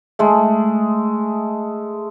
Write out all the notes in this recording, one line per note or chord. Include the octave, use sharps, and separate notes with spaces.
G#3 A3